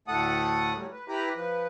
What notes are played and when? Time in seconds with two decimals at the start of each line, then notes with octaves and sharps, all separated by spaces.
0.08 D2 A2 A3 A4 F#5 D#6
0.75 A2 F#3 G3
0.92 B4
1.08 E4 G4 B4 A#5 B5
1.35 F3 B4